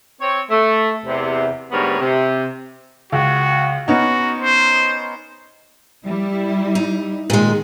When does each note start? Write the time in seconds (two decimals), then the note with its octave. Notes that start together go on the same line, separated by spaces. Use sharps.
0.21 C4 C#5
0.51 A3
1.04 E2 C3
1.71 D2 G#2 G3 B3 A#4 C#5
2.00 C3
3.12 C#2 F#4
3.88 B3 C#4 D#4 F#4
4.39 C5
6.04 G3 E4
6.75 D#4
7.30 A#2 D#3 G#3